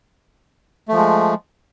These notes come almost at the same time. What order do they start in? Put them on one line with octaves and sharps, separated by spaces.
A3 F3 G#3